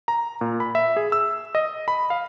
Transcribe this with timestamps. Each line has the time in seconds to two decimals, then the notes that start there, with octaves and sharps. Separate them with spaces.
0.08 A#5
0.41 A#2
0.60 B5
0.75 E5
0.97 G#4
1.12 E6
1.55 D#5
1.88 B5
2.10 F5